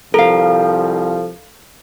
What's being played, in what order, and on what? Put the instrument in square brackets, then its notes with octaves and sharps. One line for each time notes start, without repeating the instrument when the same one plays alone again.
[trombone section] C2 F3 [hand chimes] A4 [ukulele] A#4 F5